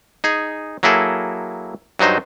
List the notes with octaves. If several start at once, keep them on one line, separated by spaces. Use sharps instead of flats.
D#4 G#4 G#5
F#3 A#3 E4 G#4 A4
G2 F#3 D#4 C5 D#5